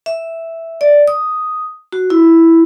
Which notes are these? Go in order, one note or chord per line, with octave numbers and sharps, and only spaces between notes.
E5
D5
D#6
F#4
E4